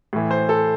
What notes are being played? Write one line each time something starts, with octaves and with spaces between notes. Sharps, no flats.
A2 E3
C5
A4